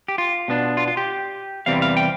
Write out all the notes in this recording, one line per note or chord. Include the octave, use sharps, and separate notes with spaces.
G4
F4
B2 B3 D4
F4
F4
G4
E2 C3 E3 G3 C4 F5
F5
G5